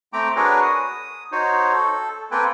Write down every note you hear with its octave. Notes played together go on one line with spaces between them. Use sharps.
A3 C4 G5 A#5 D6
D4 F#4 G#4 A#4 B4 C#5
D#6
D#4 F#4 C5 C#5
A4
A#3 C4 A4 B4 G5 G#5